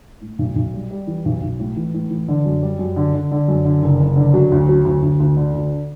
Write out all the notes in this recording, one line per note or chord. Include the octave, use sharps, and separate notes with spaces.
A2
B1
B1
G3
G3
E3
B1
B1
A2
E3
A2
E3
D3
F#2
G3
F#2
D3
D3
D3
F#2
D3
F#1
F#1
D3
F#3
D2
F#3
D2
D2
D2
D3
D2